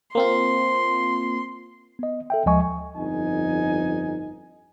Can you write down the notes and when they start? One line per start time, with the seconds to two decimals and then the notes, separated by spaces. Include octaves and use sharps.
0.15 A#3 C4 F4 C6
1.99 B3 D#5
2.30 A4 E5 G5
2.46 D2 F3 G#3 D#5 G#5 C#6
2.96 G1 F2 D#4 G#5